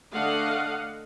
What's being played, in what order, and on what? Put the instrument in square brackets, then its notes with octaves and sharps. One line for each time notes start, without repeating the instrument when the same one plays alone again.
[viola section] D3 A3 D4 D#5 F5 F#5